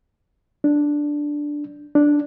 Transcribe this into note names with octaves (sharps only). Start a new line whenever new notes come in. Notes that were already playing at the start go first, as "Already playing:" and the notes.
D4
D4